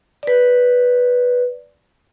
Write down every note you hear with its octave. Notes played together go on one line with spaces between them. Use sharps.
B4 D5